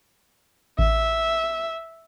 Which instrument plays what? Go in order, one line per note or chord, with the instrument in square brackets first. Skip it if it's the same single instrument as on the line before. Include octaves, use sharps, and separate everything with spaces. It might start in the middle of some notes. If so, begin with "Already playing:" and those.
[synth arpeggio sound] A1 [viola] E5